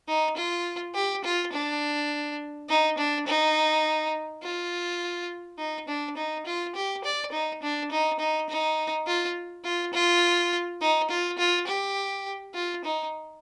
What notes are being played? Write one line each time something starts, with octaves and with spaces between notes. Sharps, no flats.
D#4
F4
G4
F4
D4
D#4
D4
D#4
F4
D#4
D4
D#4
F4
G4
D5
D#4
D4
D#4
D#4
D#4
F4
F4
F4
D#4
F4
F4
G4
F4
D#4